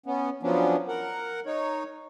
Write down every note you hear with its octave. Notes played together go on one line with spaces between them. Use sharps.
B3 C#4
F3 F#3 B3 C#4 D4
A#4 F#5
D#4 C#5